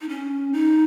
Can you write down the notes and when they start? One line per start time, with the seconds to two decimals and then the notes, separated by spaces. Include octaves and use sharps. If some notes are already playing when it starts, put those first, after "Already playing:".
0.01 D#4
0.09 C#4
0.53 D#4